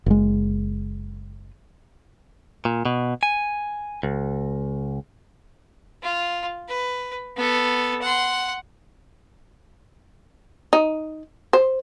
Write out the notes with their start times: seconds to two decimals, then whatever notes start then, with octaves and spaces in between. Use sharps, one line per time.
0.06 F#1 G#3
2.65 A#2
2.85 B2
3.23 G#5
4.03 C#2
6.02 F4
6.68 B4
7.37 B3 A4
8.01 F#5 C6
10.73 D#4
11.53 C5